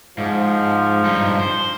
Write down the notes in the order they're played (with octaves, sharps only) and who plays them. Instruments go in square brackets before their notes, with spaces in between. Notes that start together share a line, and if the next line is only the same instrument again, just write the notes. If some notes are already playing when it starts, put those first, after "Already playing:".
[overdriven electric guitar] G#2 [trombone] F3
[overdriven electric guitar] G2 D#4
C5